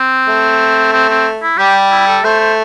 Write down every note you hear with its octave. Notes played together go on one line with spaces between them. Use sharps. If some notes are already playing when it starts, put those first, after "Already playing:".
Already playing: C4
A3
C4
C4
E4
G3 G4
E4
A4
A3 C5
C5